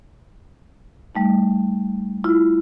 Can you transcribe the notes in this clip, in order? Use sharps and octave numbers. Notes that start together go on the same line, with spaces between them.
G3 A3 D#4
E4 F4